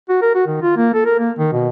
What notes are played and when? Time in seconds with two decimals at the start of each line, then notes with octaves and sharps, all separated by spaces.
0.09 F#4
0.22 A#4
0.35 F#4
0.47 D#3
0.62 F4
0.76 A#3
0.94 A4
1.06 A#4
1.19 A#3
1.38 D#3
1.52 B2